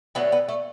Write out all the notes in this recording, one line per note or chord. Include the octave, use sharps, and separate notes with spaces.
D3 F#3 A3 B3
B3
A3